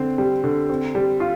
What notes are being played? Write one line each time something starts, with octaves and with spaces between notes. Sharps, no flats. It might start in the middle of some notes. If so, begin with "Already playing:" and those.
Already playing: D3 C4
G3
D3
C4
G3
F4